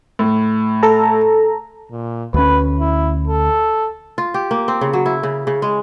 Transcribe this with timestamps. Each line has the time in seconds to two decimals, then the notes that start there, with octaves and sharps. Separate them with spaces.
0.19 A2
0.83 A4 A#5
1.91 A#2
2.34 D2 C#4 B4
2.79 E4
3.27 A4
4.18 F4
4.34 G4
4.51 A#3
4.68 C4
4.81 C#3
4.93 F#3
5.06 E4
5.23 C#3
5.47 C#3
5.62 G#3